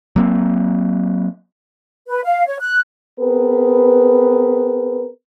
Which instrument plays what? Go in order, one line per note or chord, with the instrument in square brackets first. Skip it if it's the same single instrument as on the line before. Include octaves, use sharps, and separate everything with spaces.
[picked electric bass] F#3 A#3 C4
[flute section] B4
F5
C#5
F#6
[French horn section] B3 C4 G#4 A#4 B4